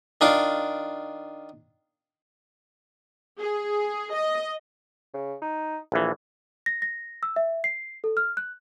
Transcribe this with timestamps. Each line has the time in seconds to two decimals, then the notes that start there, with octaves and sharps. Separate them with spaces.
0.21 D#3 D4 F4 D6
3.40 G#4
4.14 D#5
5.14 C#3
5.42 D#4
5.92 A#1 E3 A3
6.66 A#6
6.82 A#6
7.23 E6
7.36 E5
7.64 C7
8.04 A4
8.17 F6
8.37 F#6